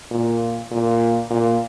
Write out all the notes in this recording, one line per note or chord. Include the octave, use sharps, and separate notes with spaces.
A#2
A#2
A#2